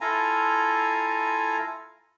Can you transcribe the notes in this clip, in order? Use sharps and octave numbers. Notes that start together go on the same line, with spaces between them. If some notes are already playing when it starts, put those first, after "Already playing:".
E4 F4 A4 F5 G#5 A#5